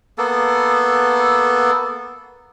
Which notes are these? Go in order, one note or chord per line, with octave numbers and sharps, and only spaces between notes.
A#3 B3 A4